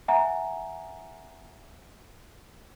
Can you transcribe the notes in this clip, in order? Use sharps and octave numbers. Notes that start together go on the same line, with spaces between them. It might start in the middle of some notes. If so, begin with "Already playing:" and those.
E5 F#5 G#5 A#5